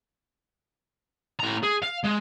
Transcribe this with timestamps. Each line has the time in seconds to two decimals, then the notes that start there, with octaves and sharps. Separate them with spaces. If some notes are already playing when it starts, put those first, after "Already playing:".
1.39 A2 A#5
1.63 G#4
1.82 F5
2.04 G#3